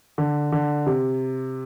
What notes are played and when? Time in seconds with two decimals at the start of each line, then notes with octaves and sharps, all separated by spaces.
0.18 D3
0.52 D3
0.86 C3